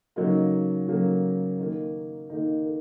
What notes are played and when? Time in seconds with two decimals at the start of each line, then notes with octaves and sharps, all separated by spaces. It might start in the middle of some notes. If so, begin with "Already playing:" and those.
0.16 C#3 F#3 A#3 D#4
0.87 C#3 F#3 A#3
1.59 D#3 A#3
2.30 D#3 A#3 D#4
2.66 A#4